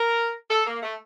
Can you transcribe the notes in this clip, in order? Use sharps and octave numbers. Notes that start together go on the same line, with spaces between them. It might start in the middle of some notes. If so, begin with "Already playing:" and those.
Already playing: A#4
A4
A#3
A3